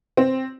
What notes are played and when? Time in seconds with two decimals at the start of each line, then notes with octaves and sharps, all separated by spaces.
0.17 C4